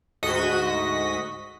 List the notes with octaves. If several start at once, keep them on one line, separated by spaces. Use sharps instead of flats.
D2 G#2 F#4 D#5 D#6 B6